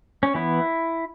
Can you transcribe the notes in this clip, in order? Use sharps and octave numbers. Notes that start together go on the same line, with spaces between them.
C#4
E3 B3 E4